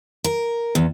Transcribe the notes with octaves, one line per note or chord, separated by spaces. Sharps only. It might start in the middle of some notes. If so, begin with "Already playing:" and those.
A#4
E2